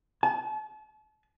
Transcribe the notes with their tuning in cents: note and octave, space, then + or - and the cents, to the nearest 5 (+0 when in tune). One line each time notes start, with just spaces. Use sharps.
A5 -40